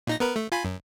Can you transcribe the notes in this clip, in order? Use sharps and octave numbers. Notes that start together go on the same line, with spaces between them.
A#2 D#4 A#6
B3 A#4 B4
A3
F4 G#5 B5
F#2